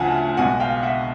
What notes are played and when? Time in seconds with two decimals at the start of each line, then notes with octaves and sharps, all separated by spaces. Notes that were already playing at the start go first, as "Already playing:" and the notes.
Already playing: D2 C#3 F3 F#5 G#5 A5
0.37 B1 B2 G#3 F#5 G#5
0.60 F5 G5
0.82 E5 F#5